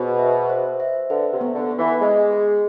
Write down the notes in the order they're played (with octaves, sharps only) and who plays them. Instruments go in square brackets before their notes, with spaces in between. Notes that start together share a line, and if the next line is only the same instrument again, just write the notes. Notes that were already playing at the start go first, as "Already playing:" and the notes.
Already playing: [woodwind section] B2 [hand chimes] G#4 C5
[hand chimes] E5
C5
E5
[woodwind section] D3 [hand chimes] B4
[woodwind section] C3
[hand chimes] B3
[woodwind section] D3
[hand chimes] B3
[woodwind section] E3
[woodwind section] G#3 [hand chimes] G#4
[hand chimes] G#4